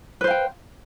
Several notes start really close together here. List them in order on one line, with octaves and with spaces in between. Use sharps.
B4 C5 F5 G5